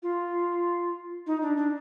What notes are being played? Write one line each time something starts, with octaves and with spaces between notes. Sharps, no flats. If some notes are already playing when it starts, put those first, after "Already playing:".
F4
D#4
D4
D4